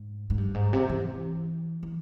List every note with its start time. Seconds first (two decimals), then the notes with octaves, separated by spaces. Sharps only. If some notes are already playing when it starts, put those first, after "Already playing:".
Already playing: G#2
0.30 G#2
0.38 G2
0.54 G#2
0.73 C3
0.89 E3
1.83 E3